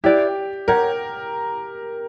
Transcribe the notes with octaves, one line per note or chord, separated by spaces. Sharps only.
E4 G4 B4 D5 G5
G4 A#4 C#5 F#5